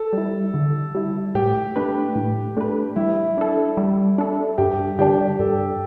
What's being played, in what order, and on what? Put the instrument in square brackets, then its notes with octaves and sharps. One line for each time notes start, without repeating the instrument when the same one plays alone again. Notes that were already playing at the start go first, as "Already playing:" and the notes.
Already playing: [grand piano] A4
[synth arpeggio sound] G3 E4
D3
G3 E4
[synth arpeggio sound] A2 [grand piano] G4
[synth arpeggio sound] A3 D4 B4
A2
A3 D4 B4
[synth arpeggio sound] G3 [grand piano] E4
[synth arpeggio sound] D4 A4
G3
D4 A4
[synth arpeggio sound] G2 [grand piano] G4
[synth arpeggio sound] D3 G3 D4 [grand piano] G4
[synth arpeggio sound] G2 [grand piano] A4